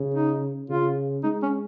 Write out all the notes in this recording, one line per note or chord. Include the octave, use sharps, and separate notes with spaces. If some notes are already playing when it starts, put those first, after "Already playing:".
Already playing: C#3
D#4
C#3 F4
G#3 D#4
C#4